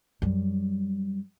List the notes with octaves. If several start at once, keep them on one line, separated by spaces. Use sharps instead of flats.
F#2 G3